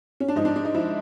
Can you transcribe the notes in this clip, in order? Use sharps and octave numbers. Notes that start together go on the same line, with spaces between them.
C#4
D4
G#2 F3 D#4
D4
D4
D#4
F3 E4